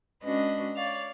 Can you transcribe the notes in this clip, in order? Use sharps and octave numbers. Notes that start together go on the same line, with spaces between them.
G#3 C#4 D4 F#4 B4 D#5
C#5 D5 F5